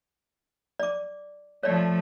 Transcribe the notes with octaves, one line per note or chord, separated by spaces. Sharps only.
D5 D6
F3 A3 C#5 D5